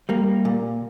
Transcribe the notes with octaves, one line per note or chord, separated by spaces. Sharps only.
G3 A#3
A#2